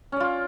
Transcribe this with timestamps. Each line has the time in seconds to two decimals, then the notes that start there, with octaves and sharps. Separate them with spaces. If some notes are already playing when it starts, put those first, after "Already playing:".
0.12 C#4
0.16 D5
0.20 F4